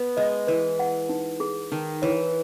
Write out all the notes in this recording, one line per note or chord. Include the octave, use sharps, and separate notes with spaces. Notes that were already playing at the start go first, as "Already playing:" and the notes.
Already playing: B3 B4
G#3 D#5
E3 B4
F#5
D#4
G#4
D#3 D#4
E3 C#5